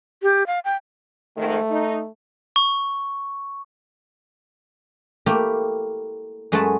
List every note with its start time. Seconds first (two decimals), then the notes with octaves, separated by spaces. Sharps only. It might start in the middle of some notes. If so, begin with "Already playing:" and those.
0.23 G4
0.47 F5
0.65 G5
1.37 F2 G#2 D#3 A3
1.70 D#4
2.56 C#6
5.26 A3 A#3 E4 G4
6.52 F#2 G#3 A3 B4 F#5 A5